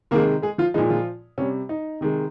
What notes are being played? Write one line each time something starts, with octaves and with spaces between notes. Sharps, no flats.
C3 D#3 G#3 A#3 A#4
G#3 G#4
F3 F4
A#2 F3 G#3 D#4
F3 F4
C3 G3 C#4
D#4
C3 D#3 G#3